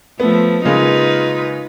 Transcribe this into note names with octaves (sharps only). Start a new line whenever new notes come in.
F3 A3 B3
C#3 G#3 A#3 D#4 F4 B4